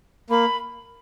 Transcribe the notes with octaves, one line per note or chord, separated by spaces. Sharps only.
A#3 B5